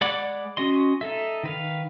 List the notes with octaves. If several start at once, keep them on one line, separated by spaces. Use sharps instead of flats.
G#3 D5 F#5 B5 D6
C#4 F#4 D#5 C6
D#4 A4 E5
D#3 B4 F5